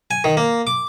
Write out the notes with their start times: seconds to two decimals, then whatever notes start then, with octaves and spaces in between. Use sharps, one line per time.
0.11 G#5
0.24 D#3
0.37 A#3
0.67 D6